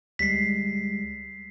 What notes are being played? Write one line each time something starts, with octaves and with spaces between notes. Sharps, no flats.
D2 G3 G#3 B6 C7